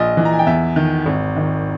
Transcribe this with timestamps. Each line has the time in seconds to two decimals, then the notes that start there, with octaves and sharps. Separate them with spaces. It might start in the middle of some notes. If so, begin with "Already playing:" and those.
Already playing: A#1 D#5
0.17 E3
0.25 A#5
0.32 G#5
0.39 G5
0.47 E2 E5
0.76 D#3
1.06 G#1
1.37 D#3